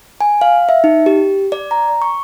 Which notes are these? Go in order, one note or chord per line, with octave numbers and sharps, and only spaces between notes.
G#5
F5
E5
D#4
G4
D5
A#5
C#6